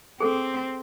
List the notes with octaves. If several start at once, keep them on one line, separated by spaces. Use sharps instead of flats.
C4 G#4 A4